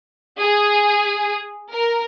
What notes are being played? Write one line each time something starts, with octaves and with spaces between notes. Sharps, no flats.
G#4
A#4